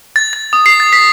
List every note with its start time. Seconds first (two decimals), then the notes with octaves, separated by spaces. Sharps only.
0.16 A6
0.33 A6
0.53 D#6
0.66 C7
0.80 A6
0.93 B6